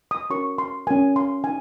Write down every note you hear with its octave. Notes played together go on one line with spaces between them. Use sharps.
D#6
C#4 F#4 A#4 C#5 C#6
C6
C#4 F#4 A#4 G#5
C6
D#4 G#5